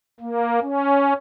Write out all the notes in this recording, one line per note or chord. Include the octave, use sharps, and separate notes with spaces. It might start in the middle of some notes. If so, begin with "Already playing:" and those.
A#3
C#4